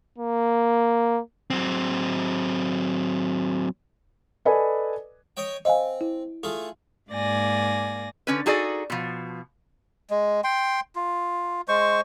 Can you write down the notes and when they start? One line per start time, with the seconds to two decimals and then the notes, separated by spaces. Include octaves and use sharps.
0.19 A#3
1.50 F#3 C4
4.45 A4 B4 D5 D#5 G#5 B5
5.37 C#5 D#5 G5
5.65 C4 D#5 F5 G#5
6.01 E4
6.43 A3 F4 G#4
7.10 G#2 A#3 D5 G#5 A#6
8.27 D3 C#4 B4
8.46 D#4 F#4 G#4 A4 D5
8.90 B2 F3
10.10 G#3
10.44 G5 C6
10.96 F4
11.68 G#3 C5 C#6